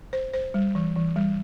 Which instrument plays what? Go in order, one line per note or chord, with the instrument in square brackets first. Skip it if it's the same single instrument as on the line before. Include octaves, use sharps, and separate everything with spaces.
[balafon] C5
C5
G3
E3
E3
G3